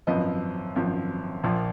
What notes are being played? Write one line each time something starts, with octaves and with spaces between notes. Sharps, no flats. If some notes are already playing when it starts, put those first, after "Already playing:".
G#1 F#2 F3 B4 D#5
G#1 F#2 F3
A#1 A#2 F3